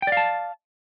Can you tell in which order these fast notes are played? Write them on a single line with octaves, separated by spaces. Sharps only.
G5 D5 F5 A5